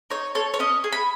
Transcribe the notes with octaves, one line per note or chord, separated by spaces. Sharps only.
D#4 C#5
A4 C#5
C#5
C#4 D#5
G#4
B5